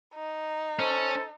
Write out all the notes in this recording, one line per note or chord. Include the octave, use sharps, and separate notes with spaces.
D#4
C#4 A4 C5